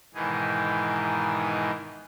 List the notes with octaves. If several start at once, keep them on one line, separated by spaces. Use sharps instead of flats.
G#2 B2 D#3 E3 D#4 G#4